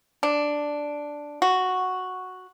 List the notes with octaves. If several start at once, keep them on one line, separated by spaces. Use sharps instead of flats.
D4
F#4